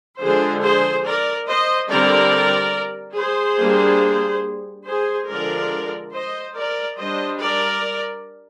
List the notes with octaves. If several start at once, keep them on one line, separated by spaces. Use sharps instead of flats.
D3 F3 G#3 D4 G#4 C5
G#4 C5
A#4 D5
C5 D#5
D3 G3 C4 A#4 D5
G#4 C5
G3 A#3 D4
G#4 C5
D3 F3 G#3 A#4 D5
C5 D#5
A#4 D5
G3 D4 C5 D#5
A#4 D5